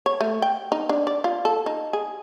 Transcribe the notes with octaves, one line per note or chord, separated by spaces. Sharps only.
C#5
A3
G5
D#4
D4
D5
F4
A4
D#4
G#4